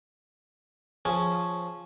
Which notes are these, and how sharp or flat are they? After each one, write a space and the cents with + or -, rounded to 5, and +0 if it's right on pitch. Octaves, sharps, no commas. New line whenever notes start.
F3 +0 C#4 +0 G#4 +0